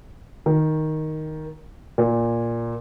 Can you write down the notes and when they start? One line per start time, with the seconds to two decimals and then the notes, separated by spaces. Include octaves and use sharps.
0.46 D#3
1.98 A#2